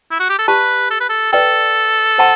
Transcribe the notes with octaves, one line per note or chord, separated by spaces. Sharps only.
E4
F#4
G4
A4
G4 B4 D5 A5
A4
B4
A4
A4 B4 D5 G5
C5 F#5 A5 C6